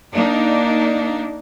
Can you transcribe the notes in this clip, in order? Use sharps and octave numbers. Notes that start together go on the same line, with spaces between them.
A#3 D4 D#4